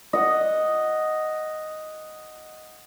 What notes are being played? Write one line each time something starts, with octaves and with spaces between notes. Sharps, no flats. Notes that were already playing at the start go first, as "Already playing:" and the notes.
D#5 F#5